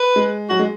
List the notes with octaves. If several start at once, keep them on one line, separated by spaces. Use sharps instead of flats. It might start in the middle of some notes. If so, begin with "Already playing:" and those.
Already playing: B4
G#3
F#3 F#4
G#3